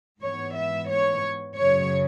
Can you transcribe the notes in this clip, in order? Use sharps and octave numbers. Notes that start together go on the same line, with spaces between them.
G#2 E3 B3 C#5
E5
C#5
F#2 C#3 F#3 C#5